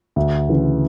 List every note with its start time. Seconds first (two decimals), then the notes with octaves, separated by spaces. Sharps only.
0.16 D2
0.49 C#3 E3